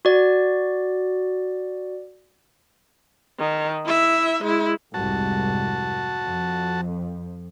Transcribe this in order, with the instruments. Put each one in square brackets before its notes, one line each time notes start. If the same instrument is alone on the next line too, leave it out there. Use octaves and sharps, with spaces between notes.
[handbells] F#4 D5
[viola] D#3
E4 E5
G#3 E4
[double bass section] C2 F2 G#2 [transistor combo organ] F#4 A5
[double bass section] F2